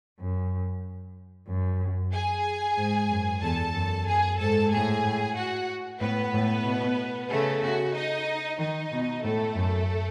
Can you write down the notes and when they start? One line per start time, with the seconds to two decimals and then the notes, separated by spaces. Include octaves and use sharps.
0.20 F#2
1.48 F#2
2.13 G#4 G#5
2.77 G#2
3.10 F#2
3.42 E2 A4 A5
3.75 F#2
4.07 F#2 G#4 G#5
4.39 G#2 A4 A5
4.71 A2 G#4 G#5
5.36 F#4 F#5
6.00 A2 B3 B4
6.34 A2
6.65 B2
7.30 C#3 A3 A4
7.62 F#4
7.94 D#4 D#5
8.59 D#3 D#4 D#5
8.92 B2
9.24 A2 A3 A4
9.55 F#2